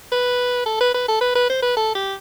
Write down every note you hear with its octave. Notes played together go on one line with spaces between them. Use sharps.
B4
A4
B4
B4
A4
B4
B4
C5
B4
A4
G4